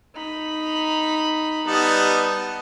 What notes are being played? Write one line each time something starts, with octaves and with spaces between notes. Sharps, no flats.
D#4 B5
G3 B3 D#4 F#5 A5